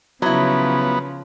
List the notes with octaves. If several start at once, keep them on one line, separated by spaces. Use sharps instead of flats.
C#3 F3 F#3 B3 E4